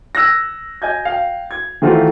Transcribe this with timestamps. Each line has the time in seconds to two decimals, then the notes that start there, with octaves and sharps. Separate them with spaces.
0.15 E6 F#6 G#6 A#6
0.82 D#5 G#5 G6 G#6
1.05 F5 G5
1.51 G#6
1.82 D#3 E3 A3 F4 F#4 C5